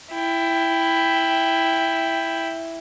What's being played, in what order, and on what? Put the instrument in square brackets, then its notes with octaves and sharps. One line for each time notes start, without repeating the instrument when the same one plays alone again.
[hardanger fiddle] E4 G5